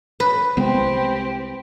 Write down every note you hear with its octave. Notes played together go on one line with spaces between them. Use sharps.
B4
C2 G#3 B3 C4 G4